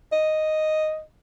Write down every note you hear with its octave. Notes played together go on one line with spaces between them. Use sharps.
D#5